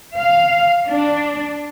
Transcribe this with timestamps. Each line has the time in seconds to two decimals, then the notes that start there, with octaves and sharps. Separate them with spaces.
0.17 F5
0.88 D4